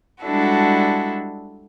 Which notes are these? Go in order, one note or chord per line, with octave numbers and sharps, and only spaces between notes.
G3 G#3 D4 E4 F#4 A4